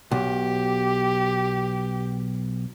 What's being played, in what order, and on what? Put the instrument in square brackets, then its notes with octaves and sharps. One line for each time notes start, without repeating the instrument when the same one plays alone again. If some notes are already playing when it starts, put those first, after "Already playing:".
[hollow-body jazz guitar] B1 [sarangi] G4